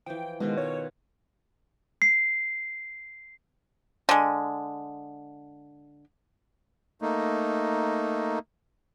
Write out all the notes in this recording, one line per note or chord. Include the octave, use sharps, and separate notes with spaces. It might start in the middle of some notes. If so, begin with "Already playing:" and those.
E3 F3 G5
B2 D#3 G#3 F4
C#5
C7
D3 G#3
A3 A#3 D#4